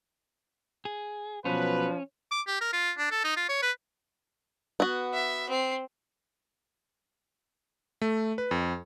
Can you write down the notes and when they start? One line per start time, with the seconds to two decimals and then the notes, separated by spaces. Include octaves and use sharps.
0.85 G#4
1.45 B2 F3 F#3 C#4 B4
2.31 D6
2.47 G4
2.61 A#4
2.73 F4
2.97 D4
3.11 A4
3.24 D#4
3.36 F4
3.49 C#5
3.62 B4
4.80 B3 F#4
5.14 E5
5.49 C4 C7
8.02 A3
8.38 B4
8.51 F2